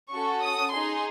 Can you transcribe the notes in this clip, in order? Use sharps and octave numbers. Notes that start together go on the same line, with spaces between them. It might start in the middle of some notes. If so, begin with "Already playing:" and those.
C#4 F#4 A4 C#6
D#6
D#4 G#4 C6